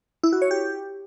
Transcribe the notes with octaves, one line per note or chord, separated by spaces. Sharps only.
E4
F#4
C#5
G4